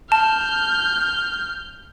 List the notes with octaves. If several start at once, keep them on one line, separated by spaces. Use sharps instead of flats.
A5 F6 G6